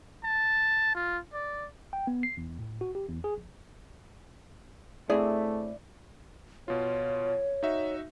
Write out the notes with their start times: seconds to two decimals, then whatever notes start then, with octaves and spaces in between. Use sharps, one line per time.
0.24 A5
0.95 F4
1.33 D5
1.93 G5
2.07 B3
2.23 C7
2.37 E2
2.59 A2
2.81 F#4
2.95 G4
3.08 E2
3.24 G#4
3.38 A#1
5.10 A2 A3 C4 E4 G#4 D5
6.68 B2 F4 C#5
7.63 D#4 F#4 E5